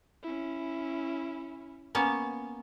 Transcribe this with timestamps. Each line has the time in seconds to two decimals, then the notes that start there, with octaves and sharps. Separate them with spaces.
0.23 C#4 E4
1.95 A#3 B3 C#4